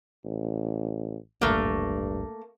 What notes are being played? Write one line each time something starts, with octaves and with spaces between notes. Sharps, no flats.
A1
D1 G#1 G2 A3 A#3